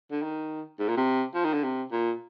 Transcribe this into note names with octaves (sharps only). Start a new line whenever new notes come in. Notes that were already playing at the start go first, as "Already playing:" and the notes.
D3
D#3
G#2
A#2
C3
F3
D#3
D3
C3
A#2